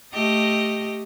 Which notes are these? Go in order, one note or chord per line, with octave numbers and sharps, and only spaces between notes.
A3 G4 D#5